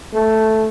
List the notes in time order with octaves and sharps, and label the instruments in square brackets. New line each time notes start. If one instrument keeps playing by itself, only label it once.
[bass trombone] A3